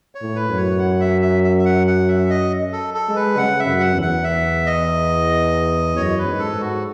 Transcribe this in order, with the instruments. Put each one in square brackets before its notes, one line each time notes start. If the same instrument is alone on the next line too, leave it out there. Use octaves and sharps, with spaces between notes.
[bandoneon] C#5
[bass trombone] A2
[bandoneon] B4
[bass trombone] F#2
[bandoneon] C#5
F#5
E5
E5
E5
E5
F#5
F#5
E5
D#5
A4
A4
[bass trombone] G#3
[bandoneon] B4
[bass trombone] C#3 [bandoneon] F#5
[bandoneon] E5
[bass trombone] F#2
[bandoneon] F#5
[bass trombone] E2
[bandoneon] F#5
E5
D#5
[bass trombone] F#2 [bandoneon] C#5
[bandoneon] B4
[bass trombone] G#2
[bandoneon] A4
[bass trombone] G#2
[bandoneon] F#4